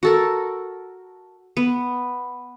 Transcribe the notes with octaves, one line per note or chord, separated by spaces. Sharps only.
F#4 A4 A#4
B3